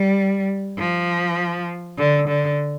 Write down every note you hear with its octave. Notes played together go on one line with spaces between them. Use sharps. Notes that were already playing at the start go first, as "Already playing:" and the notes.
Already playing: G3
F3
D3
D3